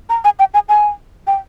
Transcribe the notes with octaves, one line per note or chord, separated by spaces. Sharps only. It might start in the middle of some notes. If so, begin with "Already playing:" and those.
A#5
G#5
G5
G#5
G#5
G5